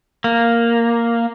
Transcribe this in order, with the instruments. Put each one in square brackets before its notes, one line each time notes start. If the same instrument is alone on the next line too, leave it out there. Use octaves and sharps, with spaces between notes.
[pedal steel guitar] A#3